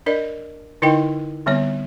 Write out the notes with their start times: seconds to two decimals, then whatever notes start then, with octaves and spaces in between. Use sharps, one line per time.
0.06 D4 A#4 D5 D#5
0.82 D3 D#4 E4 A#4 D#5 G5
1.46 D3 G3 B3 C4 C#5